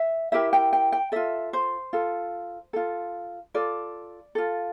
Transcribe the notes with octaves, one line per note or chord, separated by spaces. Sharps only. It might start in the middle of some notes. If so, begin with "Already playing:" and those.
Already playing: E5
E4 G4 A#4 E5
G5
G5
G5
F4 A4 E5
C5
F4 A4
F4 A4
F4 A4 D5
F4 A4